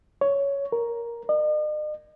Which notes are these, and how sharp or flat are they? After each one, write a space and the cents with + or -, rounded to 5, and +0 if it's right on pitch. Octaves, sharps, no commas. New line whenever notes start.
C#5 +10
A#4 +5
D#5 -45